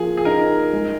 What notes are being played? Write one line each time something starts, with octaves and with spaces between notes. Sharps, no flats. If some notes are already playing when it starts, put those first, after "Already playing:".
Already playing: F3 A#3 G#4
G#4
D#4 A#4
G#3